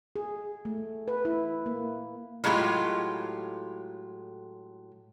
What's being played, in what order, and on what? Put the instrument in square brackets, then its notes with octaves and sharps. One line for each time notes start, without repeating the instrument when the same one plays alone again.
[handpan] G#4
A3
B4
E4
A#3
[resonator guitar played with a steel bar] A2 F#3 G#3 F4 G4